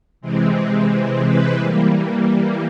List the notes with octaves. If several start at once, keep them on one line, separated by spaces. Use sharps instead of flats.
C3 E3 G#3 C4
B4
E3 G3 A#3